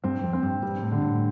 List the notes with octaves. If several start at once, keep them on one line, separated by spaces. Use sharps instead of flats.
G2 C4
F2
C4
G2
G2 G3
A2
D3
A2